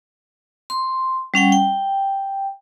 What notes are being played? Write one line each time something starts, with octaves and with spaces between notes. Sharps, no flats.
C6
G3 C#4 F#5 G5
G5